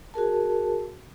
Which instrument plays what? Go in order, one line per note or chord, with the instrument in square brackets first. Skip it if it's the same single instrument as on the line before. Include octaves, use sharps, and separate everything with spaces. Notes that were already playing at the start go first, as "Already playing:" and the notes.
[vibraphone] F#4 G#4 A#4 A5